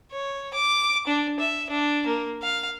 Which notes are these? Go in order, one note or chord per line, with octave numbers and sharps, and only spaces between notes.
C#5
D6
D4
E5
D4
A#3
F5